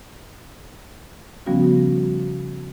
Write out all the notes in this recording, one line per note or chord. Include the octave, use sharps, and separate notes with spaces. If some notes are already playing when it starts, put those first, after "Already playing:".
C#3 F3 G3 B3 C#4 F#4